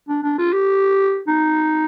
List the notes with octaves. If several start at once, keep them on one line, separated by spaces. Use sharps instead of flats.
D4
D4
F4
G4
D#4